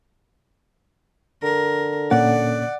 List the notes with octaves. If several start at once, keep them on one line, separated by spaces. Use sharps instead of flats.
D3 A#4
A#2 A#3 C#4 D5 F#5